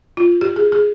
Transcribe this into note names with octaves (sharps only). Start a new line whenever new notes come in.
F4
G4
G#4
G#4